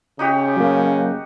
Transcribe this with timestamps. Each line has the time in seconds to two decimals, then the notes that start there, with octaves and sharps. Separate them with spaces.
0.19 C#3 D#4 F#4 G4
0.57 F#3 A#3